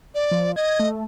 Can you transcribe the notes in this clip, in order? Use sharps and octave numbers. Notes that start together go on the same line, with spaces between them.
D5
F3
D#5 G#6
A3